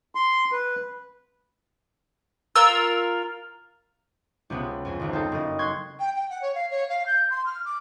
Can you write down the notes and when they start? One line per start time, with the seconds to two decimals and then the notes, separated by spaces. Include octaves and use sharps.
0.15 C6
0.52 B4
2.56 F4 A#4 E6
4.50 C#2 C3 B3
4.85 F2 G#5
5.00 G#1 C#2
5.13 C4 D#4 A4
5.32 F#1 D#5
5.59 C6 C#6 F#6 G#6
6.00 G5
6.14 G5
6.30 F#5
6.42 C#5
6.55 F5
6.71 C#5
6.89 F5
7.06 G6
7.30 C6
7.46 F6
7.65 D6